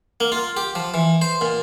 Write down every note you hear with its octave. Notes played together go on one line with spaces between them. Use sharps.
A#3
F4
G4
F3
E3
C5
A#2